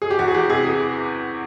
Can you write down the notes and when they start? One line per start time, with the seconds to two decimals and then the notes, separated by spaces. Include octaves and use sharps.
0.02 G#4
0.11 G4
0.19 E2 F#4
0.28 G#4
0.34 E2 G4
0.50 C3 G#4
0.64 E3 G#4